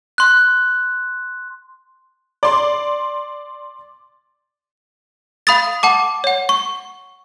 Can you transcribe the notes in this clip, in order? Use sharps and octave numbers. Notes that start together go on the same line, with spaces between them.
C6 F#6
D5 C6
F5 B5 D#6 A6
F#5 A5 D6
C#5 F#5
C#6